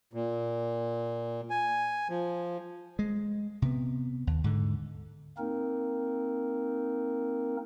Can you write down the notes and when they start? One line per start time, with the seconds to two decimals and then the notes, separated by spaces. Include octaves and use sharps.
0.13 A#2
1.50 G#5
2.10 F3
2.99 G#3
3.62 C3 B3
4.27 D#2
4.44 G#2 D3
5.38 A#3 C4 D#4 A#4